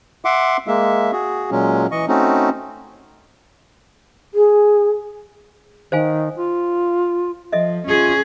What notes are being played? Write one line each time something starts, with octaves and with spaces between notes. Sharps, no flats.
E5 F#5 C6 D6
G#3 A#3 E5
F#4 G#4
A#2 F#3 G#3 C#4
E3 D#5 C#6
A3 C4 C#4 D#4 F#4
G#4
D#3 C5 F5 G#5
F4
F3 A4 D#5 E5
C#4 F4 G#4